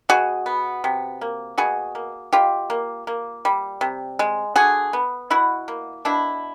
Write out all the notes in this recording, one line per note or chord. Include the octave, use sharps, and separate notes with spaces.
B2 F#4 G#4
B3
C3
A#3
B2 F#4 G#4
A#3
B2 F4 G4
A#3
A#3
G3
C3
G#3
D3 F#4 G#4
B3
B2 E4 F#4
A#3
B2 D4 E4